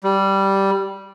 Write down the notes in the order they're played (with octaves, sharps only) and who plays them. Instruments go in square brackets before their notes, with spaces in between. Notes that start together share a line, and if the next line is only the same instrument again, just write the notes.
[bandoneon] G3